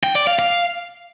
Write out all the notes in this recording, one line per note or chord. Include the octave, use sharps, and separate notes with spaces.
G5
D5
F5
F5